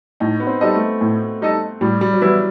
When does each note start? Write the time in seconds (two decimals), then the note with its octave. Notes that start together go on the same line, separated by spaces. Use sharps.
0.20 A2 D#4
0.40 B3
0.47 C4
0.61 G3 D#4 A4 D#5
0.74 A3
1.01 A2
1.41 G3 D#4 A4 D#5
1.81 A2 G3
2.01 G3
2.13 F#3
2.22 E3 G3 B3 E4